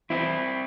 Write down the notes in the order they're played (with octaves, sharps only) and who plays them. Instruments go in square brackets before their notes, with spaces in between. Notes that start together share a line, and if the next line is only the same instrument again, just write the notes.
[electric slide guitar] E2 C4 E4